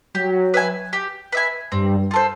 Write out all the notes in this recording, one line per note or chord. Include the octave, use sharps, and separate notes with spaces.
F#3 G4
B4 E5 G#5
G4
B4 E5 G#5
G2 G3 C4
F4 A4 C5